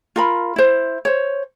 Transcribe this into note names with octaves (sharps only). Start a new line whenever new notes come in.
F4 A#4 B5
E4 C5
C5 C#5